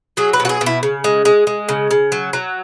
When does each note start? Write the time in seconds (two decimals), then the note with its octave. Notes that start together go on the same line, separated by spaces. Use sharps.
0.17 F#3 G#4
0.33 B4
0.40 B2
0.45 F#4
0.49 G#4
0.61 B2
0.66 E4
0.83 C#3
1.04 G#3
1.25 G#3
1.47 G#3
1.69 C#3
1.91 C#3
2.12 F#3
2.33 F#3